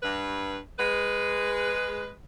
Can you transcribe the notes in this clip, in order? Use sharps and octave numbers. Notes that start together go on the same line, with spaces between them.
G2 B4
G#3 B4